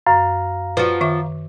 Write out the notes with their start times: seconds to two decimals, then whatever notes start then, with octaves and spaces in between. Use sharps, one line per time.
0.06 F#2 F5 A#5
0.77 F3 F#4 B4
1.01 D#3 E5 D6